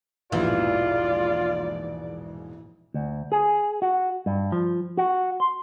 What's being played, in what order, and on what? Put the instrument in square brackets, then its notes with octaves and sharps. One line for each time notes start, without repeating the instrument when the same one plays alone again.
[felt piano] E1 A#1 G#2 [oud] E3 [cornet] F4 [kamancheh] D5
[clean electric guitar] D2
G#4
F#4
G2
F3
F#4
C6